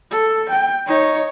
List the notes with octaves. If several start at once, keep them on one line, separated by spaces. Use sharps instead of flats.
A4
G5
D#4 C#5